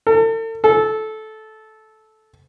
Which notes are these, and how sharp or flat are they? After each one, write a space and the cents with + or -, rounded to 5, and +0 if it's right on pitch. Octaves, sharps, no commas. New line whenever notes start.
A4 +40
A4 -15